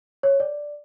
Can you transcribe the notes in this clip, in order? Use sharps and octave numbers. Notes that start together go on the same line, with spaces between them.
C#5
D5